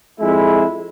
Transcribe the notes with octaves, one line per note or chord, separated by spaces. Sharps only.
F2 G#3 E4